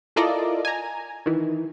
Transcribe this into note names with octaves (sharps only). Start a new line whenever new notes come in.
E4 F4 A4 A#4 D5 D#5
G#5 A#5
D#3 E3